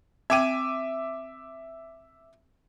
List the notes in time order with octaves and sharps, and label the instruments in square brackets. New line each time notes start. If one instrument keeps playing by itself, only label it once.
[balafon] C4 G5 [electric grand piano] E5 D6 D#7